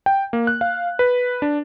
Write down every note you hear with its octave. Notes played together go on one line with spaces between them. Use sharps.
G5
A#3
F#6
F5
B4
D4